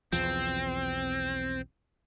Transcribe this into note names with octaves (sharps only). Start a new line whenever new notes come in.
B1 E2 F3 C4